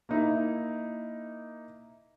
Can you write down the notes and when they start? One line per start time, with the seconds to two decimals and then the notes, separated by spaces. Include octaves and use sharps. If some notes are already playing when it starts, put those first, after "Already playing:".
0.09 A#3 D#4 E4